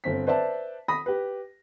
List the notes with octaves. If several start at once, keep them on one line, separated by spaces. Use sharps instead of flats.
G1 C4 B6
B4 C5 D5 E5 A5
B5 D#6 A#6
G4 B4